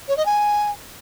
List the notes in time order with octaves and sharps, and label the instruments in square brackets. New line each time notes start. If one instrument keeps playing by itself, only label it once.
[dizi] C#5
D#5
G#5